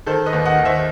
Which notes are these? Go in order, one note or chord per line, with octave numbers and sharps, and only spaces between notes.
D#3 A4 C5
B4 D#5
D#2
D#5 F#5
D#2
C5 E5